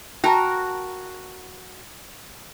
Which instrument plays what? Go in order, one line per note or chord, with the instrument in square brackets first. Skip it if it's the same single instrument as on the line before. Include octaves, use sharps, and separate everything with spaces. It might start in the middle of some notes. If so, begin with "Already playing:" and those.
[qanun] F#4 A#4 [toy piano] G5 A5 A#5